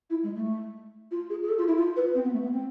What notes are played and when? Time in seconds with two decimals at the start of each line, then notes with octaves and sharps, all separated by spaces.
0.10 E4
0.23 G#3
0.35 A3
1.11 F4
1.30 G#4
1.42 G#4
1.49 A4
1.58 F4
1.67 E4
1.77 F4
1.96 B4
2.14 C4
2.24 B3
2.33 A3
2.43 B3
2.52 C4